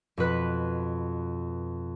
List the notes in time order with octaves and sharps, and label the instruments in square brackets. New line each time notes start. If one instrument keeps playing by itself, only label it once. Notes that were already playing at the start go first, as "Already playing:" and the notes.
[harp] F2 B2 B4 F#6